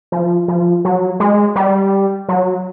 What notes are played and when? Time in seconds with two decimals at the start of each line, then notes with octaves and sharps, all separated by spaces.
0.12 F3
0.48 F3
0.85 F#3
1.20 G#3
1.56 G3
2.29 F#3